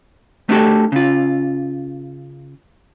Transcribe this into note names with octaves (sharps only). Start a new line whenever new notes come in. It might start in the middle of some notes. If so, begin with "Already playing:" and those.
A3 B3 D4 F#4 G4 A4
C#3 F4